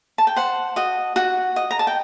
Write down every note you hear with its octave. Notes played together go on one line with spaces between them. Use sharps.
A5
G5
C5 F#5
F#4 D#5
F#4 F#5
D#5
A#5
A5
G5